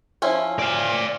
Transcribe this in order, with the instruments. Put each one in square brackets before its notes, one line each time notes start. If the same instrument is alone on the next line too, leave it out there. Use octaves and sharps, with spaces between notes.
[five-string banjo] F3 C#4 E4
[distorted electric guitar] D5 F5